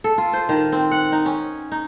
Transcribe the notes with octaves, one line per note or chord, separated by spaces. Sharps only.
A4
F4
C5
D#3
C4
F#5
D#4
C#4
D#4